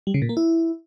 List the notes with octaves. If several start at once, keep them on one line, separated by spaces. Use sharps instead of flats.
G3
C#3
A#2
A#3
E4